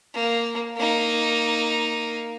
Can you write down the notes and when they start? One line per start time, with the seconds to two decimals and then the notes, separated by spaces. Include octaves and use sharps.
0.14 A#3
0.76 A#3 D#4